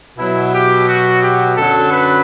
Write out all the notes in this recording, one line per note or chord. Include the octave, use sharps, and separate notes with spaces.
B2 F#3 E4
G4
F#4
G4
F#2 D3 F#3 A4
B4